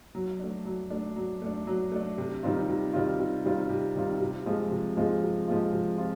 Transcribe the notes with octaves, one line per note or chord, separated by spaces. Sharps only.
F#3
A3 D4
F#3
A3 D4
F#3
A3 D4
F#3
A3 D4
C3
D#3 G3 C4 F4
C3
D#3 G3 C4 F4
C3
D#3 G3 C4 F4
C3
D#3 G3 C4 F4
C3
F3 G#3 C4 F4
C3
F3 G#3 C4 F4
C3
F3 G#3 C4 F4
C3
C4 F4